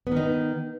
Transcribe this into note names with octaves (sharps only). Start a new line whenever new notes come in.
D#3 B3 D#4